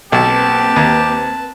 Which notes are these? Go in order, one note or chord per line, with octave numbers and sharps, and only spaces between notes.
B1 A#3 C4 G4 B4 A5
D#2